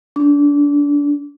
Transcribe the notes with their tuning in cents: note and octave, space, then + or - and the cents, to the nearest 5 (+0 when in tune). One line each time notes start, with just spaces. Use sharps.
D4 -25